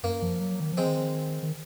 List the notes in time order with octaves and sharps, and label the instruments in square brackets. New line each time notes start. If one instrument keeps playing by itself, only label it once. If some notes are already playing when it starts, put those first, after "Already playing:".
[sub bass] F#2 [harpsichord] A#3
[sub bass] F3
F#3
D#3
F3
[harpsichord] G#3 C4
[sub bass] D#3
D#3